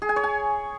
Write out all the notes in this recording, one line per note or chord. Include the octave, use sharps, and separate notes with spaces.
G#4
G#5
C#5
G#5